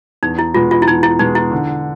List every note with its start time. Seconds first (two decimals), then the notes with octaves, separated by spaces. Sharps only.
0.23 E2 D#4
0.39 E4
0.54 B2 G#3 F4
0.71 F4
0.82 E4
0.87 E2 D#4
1.03 E4
1.19 B2 G#3 D#4
1.35 E4
1.52 D3